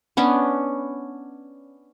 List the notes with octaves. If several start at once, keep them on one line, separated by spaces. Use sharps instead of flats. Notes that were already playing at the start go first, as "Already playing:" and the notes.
B3 C#4 D4